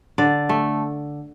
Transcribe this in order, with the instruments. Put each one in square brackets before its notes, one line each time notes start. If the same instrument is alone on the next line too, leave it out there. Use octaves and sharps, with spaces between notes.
[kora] D3 D5
A3